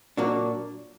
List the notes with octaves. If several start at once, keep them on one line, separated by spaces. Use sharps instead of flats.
A#2 F#3 A#3 D4 F#4